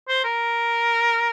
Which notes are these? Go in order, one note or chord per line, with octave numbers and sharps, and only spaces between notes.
C5
A#4